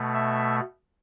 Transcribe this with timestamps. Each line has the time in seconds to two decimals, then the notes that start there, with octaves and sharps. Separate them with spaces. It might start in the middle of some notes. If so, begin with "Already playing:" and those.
Already playing: B2 A3
0.14 E5